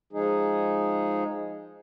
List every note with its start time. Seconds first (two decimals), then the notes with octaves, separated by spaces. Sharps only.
0.13 F3 G#3 D#4 G#4